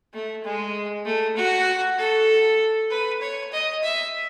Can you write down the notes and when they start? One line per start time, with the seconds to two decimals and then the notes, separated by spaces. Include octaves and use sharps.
0.13 A3
0.44 G#3
1.05 A3
1.37 F#4
1.98 A4
2.90 B4
3.21 C#5
3.52 D#5
3.83 E5